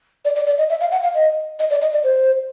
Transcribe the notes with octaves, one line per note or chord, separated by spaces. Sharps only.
D5
D5
D5
D#5
E5
F5
F#5
F5
D#5
D#5
D5
D#5
D5
C5